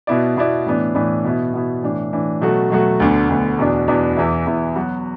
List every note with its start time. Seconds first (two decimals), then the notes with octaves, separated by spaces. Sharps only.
0.07 B2 B3 E4 D5
0.37 B2 B3 E4 D5
0.66 A2 E3 B3 D4
0.95 A2 E3 B3 D4
1.24 B2 B3 E4
1.54 B2 B3 E4
1.83 A2 E3 D4
2.12 A2 E3 D4
2.41 B2 F#3 A3 F#4
2.71 B2 F#3 A3 F#4
3.00 D2 D3 B3
3.29 D2 D3 B3
3.58 E2 B2 B3 D4
3.88 E2 B2 B3 D4
4.17 E2 E3 B3 E4
4.46 E2 E3 B3 E4
4.76 F#3 B3 F#4